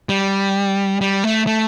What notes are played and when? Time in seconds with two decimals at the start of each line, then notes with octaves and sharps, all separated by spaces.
0.09 G3
1.01 G3
1.24 A3
1.47 A3